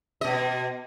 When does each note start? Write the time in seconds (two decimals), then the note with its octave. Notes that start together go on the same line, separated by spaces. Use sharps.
0.21 B2 D#5